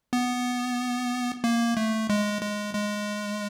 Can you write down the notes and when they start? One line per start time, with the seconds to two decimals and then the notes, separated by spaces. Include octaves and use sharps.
0.13 B3
1.44 A#3
1.77 A3
2.10 G#3
2.42 G#3
2.75 G#3